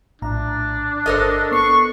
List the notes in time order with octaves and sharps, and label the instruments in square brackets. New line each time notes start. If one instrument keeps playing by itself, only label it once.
[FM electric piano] A#1 A2 A#5 [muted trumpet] D4
[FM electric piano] G1 C5 [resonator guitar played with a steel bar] A4 A#4 D#5
[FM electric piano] B3 C7 [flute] C#6